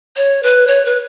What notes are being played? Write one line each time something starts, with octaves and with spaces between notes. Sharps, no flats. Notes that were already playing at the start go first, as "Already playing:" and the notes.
C#5
B4
C#5
B4